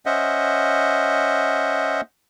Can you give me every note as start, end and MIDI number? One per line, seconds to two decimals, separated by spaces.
0.06 2.01 61
0.06 2.01 72
0.06 2.01 75
0.06 2.01 76
0.06 2.01 78